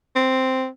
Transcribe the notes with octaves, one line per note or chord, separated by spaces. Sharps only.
C4